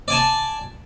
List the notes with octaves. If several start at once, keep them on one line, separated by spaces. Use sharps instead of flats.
D5 G#5 A5